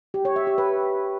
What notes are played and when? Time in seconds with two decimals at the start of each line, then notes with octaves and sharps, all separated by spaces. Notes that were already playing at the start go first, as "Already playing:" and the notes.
0.14 G4
0.25 C#5
0.36 E5
0.47 G4
0.58 B4